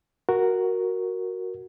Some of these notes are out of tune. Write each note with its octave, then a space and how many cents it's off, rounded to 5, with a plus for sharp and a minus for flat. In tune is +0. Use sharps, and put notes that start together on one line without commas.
F#4 +0 A#4 +0